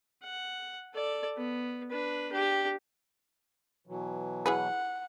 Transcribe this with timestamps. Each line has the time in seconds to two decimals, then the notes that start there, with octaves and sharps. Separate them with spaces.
0.23 F#5
0.94 A4 D5
1.37 B3
1.91 D4 B4
2.32 D4 G4
3.87 B2 E3 F#3
4.46 E4 G#4 B4 F#5